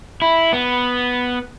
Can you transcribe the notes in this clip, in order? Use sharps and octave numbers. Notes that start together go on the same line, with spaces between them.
E4
B3